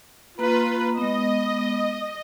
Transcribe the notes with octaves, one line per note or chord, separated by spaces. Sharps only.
A#3 F4 B4 A#5
G#3 B3 D#5